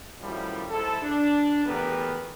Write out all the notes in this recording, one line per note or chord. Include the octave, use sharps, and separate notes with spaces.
F#2 A2 D#3 F3 G3 E4
G#2 E4 A4
D4
E2 A3 B3 G4 A#4 B4